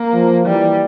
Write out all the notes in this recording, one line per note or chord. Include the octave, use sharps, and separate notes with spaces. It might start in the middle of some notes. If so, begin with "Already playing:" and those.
Already playing: A#3
F3
E3 G3